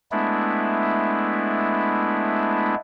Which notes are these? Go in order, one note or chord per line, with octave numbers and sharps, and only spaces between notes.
G#3 A3 B3 D4 E4